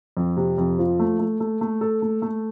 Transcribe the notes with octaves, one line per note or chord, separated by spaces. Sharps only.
F2
C3
F2
F3
A3
A3
A3
A3
A4
A3
A3